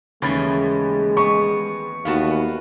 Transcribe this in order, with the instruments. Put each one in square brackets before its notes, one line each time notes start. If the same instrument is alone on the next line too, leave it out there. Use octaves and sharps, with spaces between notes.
[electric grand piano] D#2 B5 A6 [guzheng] C#3 E3 A3 [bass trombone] G#3
[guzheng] B3 [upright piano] C#6
[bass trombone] D#2 [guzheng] A3 B3 A5 [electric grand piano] F#4 F5